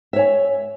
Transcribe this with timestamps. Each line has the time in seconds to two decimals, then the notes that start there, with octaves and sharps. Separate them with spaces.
0.13 E5
0.16 C#5
0.19 G#5